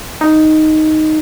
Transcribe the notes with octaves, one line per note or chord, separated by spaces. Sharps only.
D#4